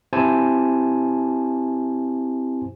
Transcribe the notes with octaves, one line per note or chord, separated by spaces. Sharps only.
C4 E4 G4 C5 G#5 A5